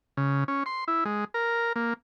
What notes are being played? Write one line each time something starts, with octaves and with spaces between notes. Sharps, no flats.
C#3
C#4
C6
E4
G#3
A#4
A#3